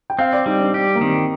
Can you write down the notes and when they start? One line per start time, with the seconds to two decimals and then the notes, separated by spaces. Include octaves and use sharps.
0.10 G5
0.19 C4 F5
0.33 D5
0.46 G3 D#4
0.60 D4
0.73 D4 G4
0.95 A#3
1.01 D#3 C4